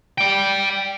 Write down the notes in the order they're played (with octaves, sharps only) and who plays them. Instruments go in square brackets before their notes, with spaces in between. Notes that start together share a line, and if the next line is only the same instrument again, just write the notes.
[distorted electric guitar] D5 G5